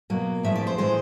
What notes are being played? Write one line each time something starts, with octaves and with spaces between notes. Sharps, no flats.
B2 F#3 A#3
A2 F3 G#3 C4 E5
D5
C5
A2 E3 G#3 C5